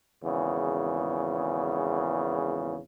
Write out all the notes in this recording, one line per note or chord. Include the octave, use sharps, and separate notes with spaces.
G#1 E2 C#3